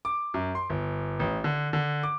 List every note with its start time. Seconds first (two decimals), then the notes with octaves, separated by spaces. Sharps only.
0.05 D6
0.34 F#2
0.55 C6
0.70 G1
1.19 A1
1.44 D3
1.73 D3
2.03 D6